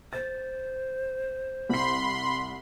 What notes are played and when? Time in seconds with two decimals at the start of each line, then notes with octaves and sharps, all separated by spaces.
0.13 C5 A6
1.69 C2 B5 C6 C7